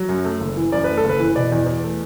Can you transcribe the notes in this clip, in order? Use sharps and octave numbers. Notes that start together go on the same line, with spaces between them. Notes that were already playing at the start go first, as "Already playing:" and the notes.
Already playing: F#3
F#2
A3
F#1
E3
F#2 D5
A3 B4
A4
F#1
B4
E3
B2 D5
E2
E2
A3